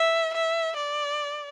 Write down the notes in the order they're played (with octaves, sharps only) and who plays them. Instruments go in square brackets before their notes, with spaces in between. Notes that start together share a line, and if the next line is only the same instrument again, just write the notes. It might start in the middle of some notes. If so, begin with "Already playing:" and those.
Already playing: [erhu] E5
E5
D5